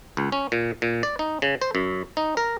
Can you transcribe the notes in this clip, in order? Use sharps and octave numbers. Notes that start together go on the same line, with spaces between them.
C#2
C#4
A#2
A#2
D5
D#4
C#3
C5
F#2
D#4
A#4